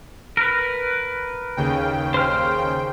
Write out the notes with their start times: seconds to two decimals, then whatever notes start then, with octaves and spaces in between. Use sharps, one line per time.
0.37 A#4 B4
1.57 D#2 C#3 G5
2.14 C5 F6